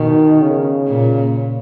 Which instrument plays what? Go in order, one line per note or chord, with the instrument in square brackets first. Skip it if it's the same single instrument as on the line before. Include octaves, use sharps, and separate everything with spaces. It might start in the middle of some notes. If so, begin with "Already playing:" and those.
Already playing: [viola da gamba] B2 [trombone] D#3
[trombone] C#3
[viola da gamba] A#2